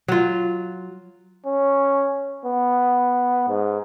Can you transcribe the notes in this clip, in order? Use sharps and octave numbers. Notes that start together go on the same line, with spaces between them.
F#3 F4
C#4
B3
G#2